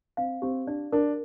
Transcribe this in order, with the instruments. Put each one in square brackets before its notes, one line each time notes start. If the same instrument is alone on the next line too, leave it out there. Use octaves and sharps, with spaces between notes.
[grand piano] C4 [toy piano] F5
[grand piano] C4 [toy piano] G4
[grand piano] D4 [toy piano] D5
[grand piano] D4 [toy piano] A#4